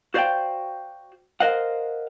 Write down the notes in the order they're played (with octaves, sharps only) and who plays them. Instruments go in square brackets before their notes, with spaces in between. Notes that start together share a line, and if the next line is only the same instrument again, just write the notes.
[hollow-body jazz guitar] F#4 C5 D5 E5 F5 G5
A#4 C5 D#5 F5 F#5